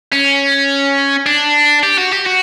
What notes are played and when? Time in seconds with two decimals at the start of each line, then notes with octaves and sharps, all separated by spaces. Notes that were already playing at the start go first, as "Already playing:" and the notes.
0.12 C#4
1.26 D4
1.83 G4
1.98 F#4
2.12 G4
2.26 F#4